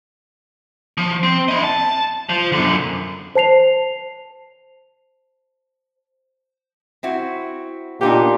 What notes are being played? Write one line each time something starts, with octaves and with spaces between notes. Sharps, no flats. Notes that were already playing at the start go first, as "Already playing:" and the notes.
F3
C4
E4 D#5
A5
F3
F#2 D3
C5 A5 C7 F7
C4 E4 F#4
A#2 B3 D4 D#4 G4